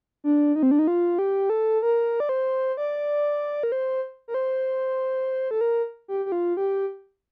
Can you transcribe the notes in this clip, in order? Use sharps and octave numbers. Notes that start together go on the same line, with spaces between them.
D4
D#4
C4
D4
D#4
F4
G4
A4
A#4
D5
C5
D5
A#4
C5
A#4
C5
A4
A#4
G4
G4
F4
G4